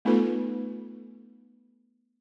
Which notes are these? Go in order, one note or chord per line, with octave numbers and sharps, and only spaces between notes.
A3 B3 D#4 F4 A4 B4